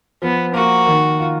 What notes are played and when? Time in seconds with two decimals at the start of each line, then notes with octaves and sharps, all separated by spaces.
0.22 F3 B3
0.54 A#3 F#4
0.86 D#3
1.19 F4